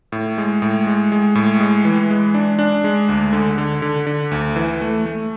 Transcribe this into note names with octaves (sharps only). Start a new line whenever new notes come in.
A2
G#3
A2
G#3
G#3
A2
G#3
E3
G#3
D4
D4
G#3
D2
D3
D3
D3
D3
D2
E3
A3
A3